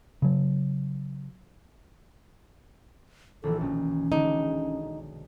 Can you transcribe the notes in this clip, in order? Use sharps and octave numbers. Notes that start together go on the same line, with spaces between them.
C#3 F#3
A#1 D#3 E3 A4
B1 C#4
B1 D3 G#3 D#4